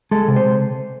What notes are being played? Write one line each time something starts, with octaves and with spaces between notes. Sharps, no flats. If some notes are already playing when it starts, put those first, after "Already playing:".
G#3 A4
C3
C5